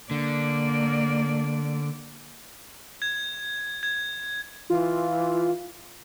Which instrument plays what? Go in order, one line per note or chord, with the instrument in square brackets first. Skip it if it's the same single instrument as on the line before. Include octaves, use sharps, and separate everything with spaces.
[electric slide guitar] D3 [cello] A#3 D5
[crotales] G#6
G#6
[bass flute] E3 [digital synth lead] F4